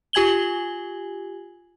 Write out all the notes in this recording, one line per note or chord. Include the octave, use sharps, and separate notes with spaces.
F4 G4 G#5 G#6 F#7 G7